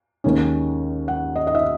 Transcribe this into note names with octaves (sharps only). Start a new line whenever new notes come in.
D#2 D#3 G#3 C#4
F#5
D#5
D#5
E5